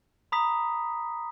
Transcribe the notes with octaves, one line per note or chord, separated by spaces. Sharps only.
A#5 B5 D#6 B6